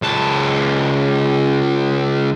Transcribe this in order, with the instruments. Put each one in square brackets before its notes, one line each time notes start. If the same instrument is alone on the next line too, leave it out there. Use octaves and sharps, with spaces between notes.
[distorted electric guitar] C#2 A5